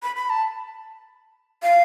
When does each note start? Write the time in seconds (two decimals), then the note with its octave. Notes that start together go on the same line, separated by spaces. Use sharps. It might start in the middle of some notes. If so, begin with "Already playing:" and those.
0.03 B5
0.16 B5
0.30 A5
1.63 F5